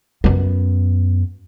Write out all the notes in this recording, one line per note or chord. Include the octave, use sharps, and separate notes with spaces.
F#2 B3